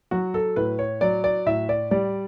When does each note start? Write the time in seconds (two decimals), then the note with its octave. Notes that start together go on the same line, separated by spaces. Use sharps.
0.11 F#3 F#4
0.34 A4
0.56 A2 B4
0.79 C#5
1.01 F#3 D5
1.24 D5
1.46 A2 E5
1.69 D5
1.91 G3 D5